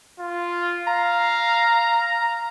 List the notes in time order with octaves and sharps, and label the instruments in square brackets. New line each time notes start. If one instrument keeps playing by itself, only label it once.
[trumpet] F4
[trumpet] F5 [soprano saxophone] A#5